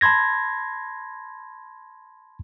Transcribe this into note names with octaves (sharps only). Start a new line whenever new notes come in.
A5 B5 C6 G#6 A#6